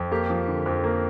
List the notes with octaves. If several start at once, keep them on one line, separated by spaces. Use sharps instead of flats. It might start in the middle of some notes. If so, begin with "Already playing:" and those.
Already playing: F2
A#3 G4
F3
D3
F2
A#3